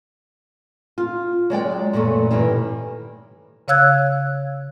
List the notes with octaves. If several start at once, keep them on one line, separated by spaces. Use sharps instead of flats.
F4
F#3 G#3 D5 G5
F#2 A#2 E3 A3
G2 B2 D#3 E3
C#3 C#5 F5 E6 F#6 G#6